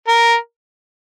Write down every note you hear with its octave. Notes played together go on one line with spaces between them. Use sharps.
A#4